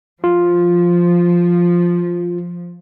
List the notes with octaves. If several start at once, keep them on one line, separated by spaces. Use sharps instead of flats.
F3 F4